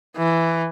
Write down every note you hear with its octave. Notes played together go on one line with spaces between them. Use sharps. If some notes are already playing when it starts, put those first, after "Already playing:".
E3